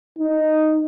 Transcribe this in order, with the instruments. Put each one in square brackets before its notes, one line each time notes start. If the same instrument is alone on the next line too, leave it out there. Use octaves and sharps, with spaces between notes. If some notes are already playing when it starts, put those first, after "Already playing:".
[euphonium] D#4